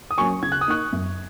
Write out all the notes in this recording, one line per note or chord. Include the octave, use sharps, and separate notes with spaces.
D#6
F#3 A#3 C#4 G#5 C#6
C#3 G#6
F#6
D#6
A#3 D#4 C#6 F#6
F#2